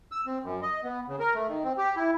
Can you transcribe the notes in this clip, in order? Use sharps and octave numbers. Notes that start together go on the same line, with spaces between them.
E6
C4
F#2
D#5
B3
C#3
A#4
A3
D#3
C4
G4
E4